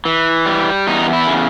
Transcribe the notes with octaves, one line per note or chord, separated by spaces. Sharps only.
E3
G3
E2 D#4
E4
C#3